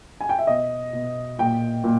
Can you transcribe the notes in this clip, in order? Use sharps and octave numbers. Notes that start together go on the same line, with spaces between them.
G#5
G5
E5
B2 D#5
B2
A#2 G5
A#2